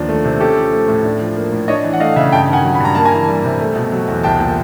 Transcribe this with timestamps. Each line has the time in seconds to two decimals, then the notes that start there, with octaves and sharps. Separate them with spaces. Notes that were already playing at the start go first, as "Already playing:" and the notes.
Already playing: D#2 F3 D4
0.09 A3
0.25 C3
0.40 C#4 G4 A4
0.56 F3
0.73 A3
0.88 A2
1.04 D4
1.21 F3
1.36 A#3
1.52 A2
1.68 D4 C#5 D#5
1.84 E3
1.93 F#5
2.00 A3 D#5 F5
2.16 C#3 E5 F#5
2.32 G2 G5 A5
2.48 D#3
2.53 F#5 G#5
2.64 F#3
2.75 B5
2.80 G2 A#5
2.95 A#3 A5
3.05 G#5 A#5
3.12 E3
3.28 G3
3.44 C3
3.60 A3
3.76 B2
3.92 F#3
4.08 E2
4.23 C2 G5 A5
4.40 A#2